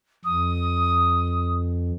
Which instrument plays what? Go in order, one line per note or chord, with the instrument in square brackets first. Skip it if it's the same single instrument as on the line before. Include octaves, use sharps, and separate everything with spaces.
[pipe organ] F2 [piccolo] D#6